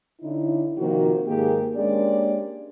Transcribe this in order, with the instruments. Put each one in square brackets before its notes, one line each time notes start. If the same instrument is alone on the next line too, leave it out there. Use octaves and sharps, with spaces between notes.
[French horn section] D3 C#4 D#4 E4
C3 D#3 F3 A#3 F4 F#4
G#2 D#3 A#3 G4 G#4
G#3 A#3 C#4 D4 G4 D5